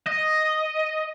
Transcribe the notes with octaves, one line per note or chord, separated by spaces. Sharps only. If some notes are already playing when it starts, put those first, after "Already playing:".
D#5